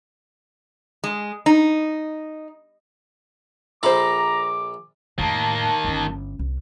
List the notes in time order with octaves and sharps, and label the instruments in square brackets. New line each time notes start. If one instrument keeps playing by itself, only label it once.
[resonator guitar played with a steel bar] G#3
D#4
[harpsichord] A#1 A4 B5 [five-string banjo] F4 C5 [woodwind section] A#5 [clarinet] D6
[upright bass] F2 A2 [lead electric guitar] D#3 A#3 [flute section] A5
[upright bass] G1 C#4
C2